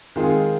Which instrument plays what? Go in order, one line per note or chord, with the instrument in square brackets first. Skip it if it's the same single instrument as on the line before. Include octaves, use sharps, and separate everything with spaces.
[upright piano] D#3 G#3 C4 F4 G#4